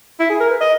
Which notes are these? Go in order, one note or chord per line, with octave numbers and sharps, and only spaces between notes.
E4
G#4
A#4
B4
D#5